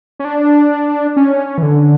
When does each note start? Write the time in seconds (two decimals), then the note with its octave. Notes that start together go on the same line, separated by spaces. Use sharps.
0.20 C#4
0.25 D4
1.17 C#4
1.58 E3
1.63 D3